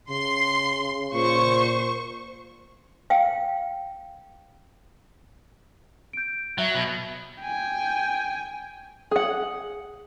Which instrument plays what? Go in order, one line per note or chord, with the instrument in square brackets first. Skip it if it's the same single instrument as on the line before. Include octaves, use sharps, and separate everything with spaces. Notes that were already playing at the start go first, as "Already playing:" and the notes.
[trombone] C#3 [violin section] C6
[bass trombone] A#2 [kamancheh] C5 [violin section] C#6
[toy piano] F5 G5
[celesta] G6 D7
[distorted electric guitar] F#3 [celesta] E5
[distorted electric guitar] B2
[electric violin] G5 G#5
[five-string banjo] G#4 F#5